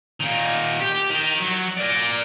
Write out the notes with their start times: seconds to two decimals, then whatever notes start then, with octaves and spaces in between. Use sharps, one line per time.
0.20 A#2 D#3
0.80 G4
1.10 D#3
1.41 F#3
1.77 A#4 D5